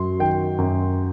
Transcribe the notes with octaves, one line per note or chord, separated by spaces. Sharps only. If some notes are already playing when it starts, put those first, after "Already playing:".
Already playing: F#2 F#3 C6
D#3 G5
F#2